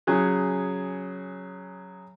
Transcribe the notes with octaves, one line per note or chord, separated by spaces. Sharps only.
C#3 F#3 G#4